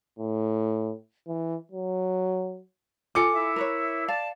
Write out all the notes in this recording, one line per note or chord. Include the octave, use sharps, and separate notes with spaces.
A2
E3
F#3
F4 A4 G#5 D6 C#7
E4 E5
A#4 B4 C#5
D5 F5 A5